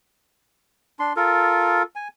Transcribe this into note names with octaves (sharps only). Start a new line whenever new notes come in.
D4 C6
F4 A4 A#4
G#5